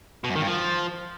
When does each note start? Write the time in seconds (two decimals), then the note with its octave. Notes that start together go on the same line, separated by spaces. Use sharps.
0.24 B2
0.30 F#2
0.36 D#3
0.41 G2
0.47 F3